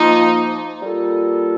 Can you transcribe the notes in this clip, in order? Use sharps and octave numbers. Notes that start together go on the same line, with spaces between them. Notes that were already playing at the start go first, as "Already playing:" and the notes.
Already playing: F3 A#3 D#4 F4
G3 A#3 F4 A4